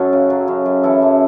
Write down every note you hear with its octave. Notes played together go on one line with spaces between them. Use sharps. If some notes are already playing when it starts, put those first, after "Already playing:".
Already playing: F#2 F#3 C#4 F#4 A4
C#3
F#3
F#2
F#2
E3 E4 A4
F#2